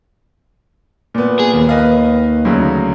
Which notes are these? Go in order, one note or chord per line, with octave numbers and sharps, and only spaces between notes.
A#2 B3
G#4
D#2
B4 D#5 F5
D2 C#3 F#3